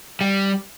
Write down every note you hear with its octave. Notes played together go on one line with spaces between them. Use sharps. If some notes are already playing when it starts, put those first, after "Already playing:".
G3